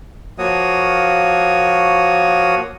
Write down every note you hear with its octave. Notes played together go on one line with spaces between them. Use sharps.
F3 A#3 F#4 C#5 D#6